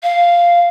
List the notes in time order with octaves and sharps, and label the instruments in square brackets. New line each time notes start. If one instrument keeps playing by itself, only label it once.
[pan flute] F5